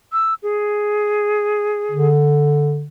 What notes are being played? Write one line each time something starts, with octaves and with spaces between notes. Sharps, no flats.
E6
G#4
D3